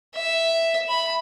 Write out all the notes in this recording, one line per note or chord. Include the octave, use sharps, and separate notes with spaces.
E5
B5